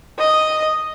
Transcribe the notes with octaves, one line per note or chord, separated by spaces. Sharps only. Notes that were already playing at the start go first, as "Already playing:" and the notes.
D#5